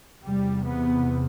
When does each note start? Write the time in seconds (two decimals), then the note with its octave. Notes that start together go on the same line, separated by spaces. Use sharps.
0.23 E2 C3 G3
0.66 B3